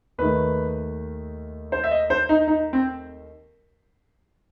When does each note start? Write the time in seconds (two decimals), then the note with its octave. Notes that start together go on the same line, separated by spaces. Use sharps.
0.18 D#2 D#3 A3 B4
1.72 C5
1.84 E5
1.91 D#5
2.10 C5
2.29 D#4
2.47 D#4
2.73 C4